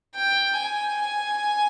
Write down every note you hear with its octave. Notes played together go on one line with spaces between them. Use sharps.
G5
G#5